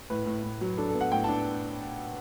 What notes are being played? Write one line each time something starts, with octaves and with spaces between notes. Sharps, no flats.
A2 B4
A2
A2
F#3
D4 A4
A4
B3
F#5
A2 G5
A5
D4